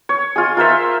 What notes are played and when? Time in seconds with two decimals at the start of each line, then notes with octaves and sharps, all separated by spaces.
0.09 C#5
0.36 F4 G#4
0.57 F4 A#4 C5 E5